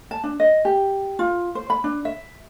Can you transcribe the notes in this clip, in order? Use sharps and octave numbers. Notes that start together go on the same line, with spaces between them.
A5
D4
D#5
G4
F4
C5
B5
D4
E5